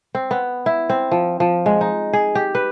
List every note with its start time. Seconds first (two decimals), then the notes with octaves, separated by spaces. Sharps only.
0.15 C4
0.31 B3
0.66 E4
0.90 C4
1.11 F3
1.40 F3
1.66 G#3
1.81 D#4
2.13 G#4
2.35 G4
2.55 B4